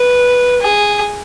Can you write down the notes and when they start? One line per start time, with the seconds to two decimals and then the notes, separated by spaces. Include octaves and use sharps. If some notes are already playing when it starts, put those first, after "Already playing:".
Already playing: B4
0.61 G#4